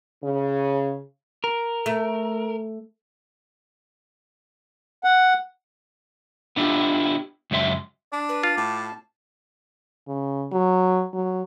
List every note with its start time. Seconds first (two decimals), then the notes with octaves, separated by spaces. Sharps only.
0.23 C#3
1.44 A#4
1.86 A3
5.04 F#5
6.56 B3 D4 E4 F4 G4
7.51 C#2 F#2 F#3 E5 C6
8.13 D4 D5
8.29 B4
8.43 F4
8.57 A2 A5 D6
10.08 C#3
10.52 F#3
11.14 F#3